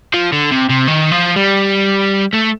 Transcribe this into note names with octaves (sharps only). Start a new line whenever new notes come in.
F3
D3
C3
C3
D#3
F3
G3
A3